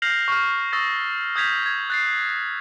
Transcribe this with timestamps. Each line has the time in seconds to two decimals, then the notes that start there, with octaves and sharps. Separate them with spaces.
0.02 F6 G6 A#6 C7 F7 F#7
0.28 C#6 F6
0.72 C#6 D#6 E6 A6 A#6
1.36 D#6 G6 G#6 B6 F7
1.66 G#6
1.90 F#6 A6 C7